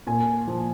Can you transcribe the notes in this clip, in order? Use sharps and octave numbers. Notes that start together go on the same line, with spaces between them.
A#2 G#5
F3